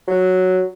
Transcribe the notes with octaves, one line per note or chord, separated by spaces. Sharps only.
F#3